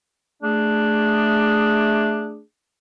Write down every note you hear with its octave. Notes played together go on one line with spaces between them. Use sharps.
A3 D4 G#4